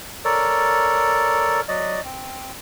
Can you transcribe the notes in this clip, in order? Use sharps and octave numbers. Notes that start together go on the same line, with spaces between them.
A4 A#4 C#5 D5
F#3 D5 D#5
C4